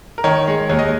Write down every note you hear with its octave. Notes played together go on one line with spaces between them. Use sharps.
A#4
D#3 C#5
G#3
D#2 C#5
D#5